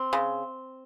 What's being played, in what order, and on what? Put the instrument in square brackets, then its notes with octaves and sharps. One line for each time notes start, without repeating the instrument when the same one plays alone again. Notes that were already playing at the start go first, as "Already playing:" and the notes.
Already playing: [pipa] C4
C#3